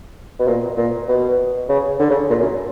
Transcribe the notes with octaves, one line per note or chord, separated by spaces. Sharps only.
B2
A#2
A#2
B2
C#3
D3
C#3
A#2
F#2